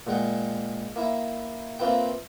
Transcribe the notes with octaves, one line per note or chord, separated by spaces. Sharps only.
A#2 G#3 F#5 G5
A#3 E4
A#3 C4 F4 B4 E5 G5